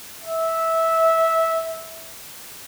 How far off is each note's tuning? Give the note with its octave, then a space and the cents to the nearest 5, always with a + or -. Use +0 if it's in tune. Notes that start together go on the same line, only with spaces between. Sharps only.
E5 -15